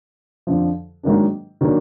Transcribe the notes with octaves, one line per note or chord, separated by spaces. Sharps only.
F2 D3 F3
G#2 D#3 F#3 A#3 D4
D#3 F#3 A#3 D4